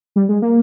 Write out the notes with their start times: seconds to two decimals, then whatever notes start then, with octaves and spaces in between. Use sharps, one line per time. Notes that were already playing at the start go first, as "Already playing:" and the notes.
0.16 G3
0.29 G#3
0.42 A#3